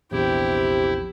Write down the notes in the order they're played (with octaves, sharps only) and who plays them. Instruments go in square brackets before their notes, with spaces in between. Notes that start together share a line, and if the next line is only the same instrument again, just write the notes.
[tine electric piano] A#1 E2 [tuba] C3 [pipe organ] E4 [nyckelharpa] G4